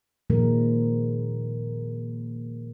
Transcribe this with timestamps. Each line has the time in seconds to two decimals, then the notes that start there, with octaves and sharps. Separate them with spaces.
0.30 A#2 D#3 F3 G#3 A#3 A#4